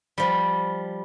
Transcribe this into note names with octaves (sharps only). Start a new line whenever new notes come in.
F3 G3